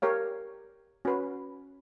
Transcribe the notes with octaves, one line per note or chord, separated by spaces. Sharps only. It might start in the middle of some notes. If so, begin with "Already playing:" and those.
G4 A#4 C#5 F5
C#4 F#4 B4